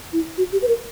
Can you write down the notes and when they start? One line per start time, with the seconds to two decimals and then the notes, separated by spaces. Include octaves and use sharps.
0.13 E4
0.37 F#4
0.53 G4
0.62 B4
0.68 A#4